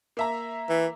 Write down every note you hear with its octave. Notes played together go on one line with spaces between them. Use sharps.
A#3 E5 A#5
E3